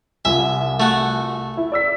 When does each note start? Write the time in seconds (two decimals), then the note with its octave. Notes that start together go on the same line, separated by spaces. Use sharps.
0.25 C2 F4 E5 G#5
0.80 A3 F#4
1.57 E4
1.72 D5 E6 B6